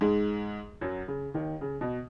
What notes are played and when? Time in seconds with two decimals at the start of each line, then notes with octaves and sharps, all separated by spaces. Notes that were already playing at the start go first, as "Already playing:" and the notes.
0.01 G#2 G#3
0.81 F#2 F#3
1.08 C#3
1.34 D#2 D#3
1.61 C#3
1.81 B2